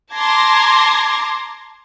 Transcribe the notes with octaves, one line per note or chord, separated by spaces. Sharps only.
A5 A#5 C6 D6 G#6 A#6